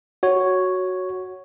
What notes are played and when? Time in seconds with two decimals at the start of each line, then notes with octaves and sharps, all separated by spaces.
0.23 F#4 C#5